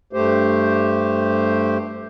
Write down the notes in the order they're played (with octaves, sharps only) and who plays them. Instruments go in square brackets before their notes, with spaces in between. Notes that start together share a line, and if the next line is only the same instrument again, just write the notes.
[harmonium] G2 A3 G4 C5